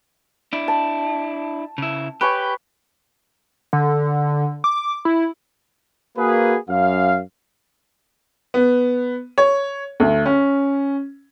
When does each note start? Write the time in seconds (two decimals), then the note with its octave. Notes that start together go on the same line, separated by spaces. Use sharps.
0.53 D4 E4
0.68 A5
1.78 C#3 E4
2.21 G4 B4 C#5 G#5
3.73 D3
4.64 D6
5.05 E4
6.17 A#3 F#4 G#4 B4
6.69 F#2 F5
8.54 B3
9.38 C#5
10.00 D2
10.26 C#4